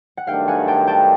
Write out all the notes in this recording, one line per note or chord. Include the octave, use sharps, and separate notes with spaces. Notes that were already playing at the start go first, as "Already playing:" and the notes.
F#5
G2 D#3 F#3 A3 D4 F5 G5
F#5 G#5
G5 A5
G5 A5